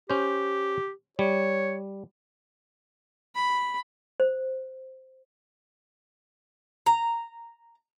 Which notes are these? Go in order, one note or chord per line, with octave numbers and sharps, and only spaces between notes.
C#4 G4 C5
G3 C#5
B5
C5
A#5